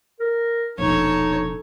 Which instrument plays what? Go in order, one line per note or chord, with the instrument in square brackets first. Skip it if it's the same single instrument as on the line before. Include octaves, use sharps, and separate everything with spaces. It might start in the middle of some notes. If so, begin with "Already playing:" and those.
[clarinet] A#4
[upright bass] E1 A#1 [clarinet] D#4 [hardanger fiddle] A4 C#5